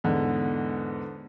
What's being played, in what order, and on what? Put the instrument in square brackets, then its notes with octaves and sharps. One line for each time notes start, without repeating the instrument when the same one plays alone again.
[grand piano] E2 G#2 D3